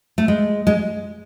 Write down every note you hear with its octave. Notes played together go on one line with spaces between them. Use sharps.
A3
G#3
G#3